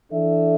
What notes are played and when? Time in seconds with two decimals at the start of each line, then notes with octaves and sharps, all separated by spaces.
0.12 E3 D4 A4 E5